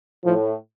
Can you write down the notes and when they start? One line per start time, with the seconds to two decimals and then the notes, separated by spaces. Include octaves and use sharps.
0.25 A2 F3